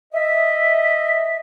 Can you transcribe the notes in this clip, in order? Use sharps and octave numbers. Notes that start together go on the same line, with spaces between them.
D#5 E5